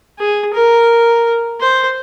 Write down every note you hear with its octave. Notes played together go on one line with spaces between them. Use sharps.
G#4
A#4
C5